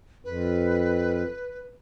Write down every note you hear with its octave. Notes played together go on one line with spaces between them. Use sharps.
F2 B4